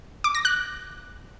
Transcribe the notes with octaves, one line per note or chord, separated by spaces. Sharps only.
D6
A#6
F#6